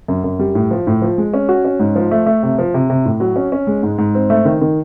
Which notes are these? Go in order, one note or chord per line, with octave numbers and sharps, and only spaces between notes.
F#2
F#2
G3
A2
F3
A2
F3
G#3
C#4
F#4
C#4
G#2
F3
A3
A3
C3
F3
C3
C3
A2
F#3
C#4
C#4
G#3
G#2
G#2
C4
A3
D#3
D#3